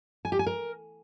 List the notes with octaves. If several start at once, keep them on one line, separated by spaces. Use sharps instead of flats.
G#5
G4
G#5
A#4